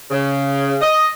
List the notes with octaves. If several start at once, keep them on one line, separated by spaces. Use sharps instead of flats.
C#3
D#5